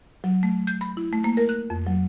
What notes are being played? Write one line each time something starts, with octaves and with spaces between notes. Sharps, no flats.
F#3
A3
G6
B5
E4
A3
A#3
A#4
F#6
F2
F#3